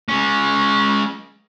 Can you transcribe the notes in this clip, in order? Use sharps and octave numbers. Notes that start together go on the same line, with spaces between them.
G#3 C#4